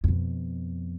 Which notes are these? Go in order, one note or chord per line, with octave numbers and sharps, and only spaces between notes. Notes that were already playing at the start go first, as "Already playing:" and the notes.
F2 B2